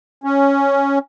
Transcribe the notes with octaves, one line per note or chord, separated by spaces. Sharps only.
C#4